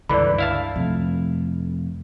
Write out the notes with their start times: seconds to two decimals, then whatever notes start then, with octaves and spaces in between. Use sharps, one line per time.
0.09 C#2 G2 D3 E3 D5 B5
0.38 E4 F5 A5
0.76 F2 C3 A3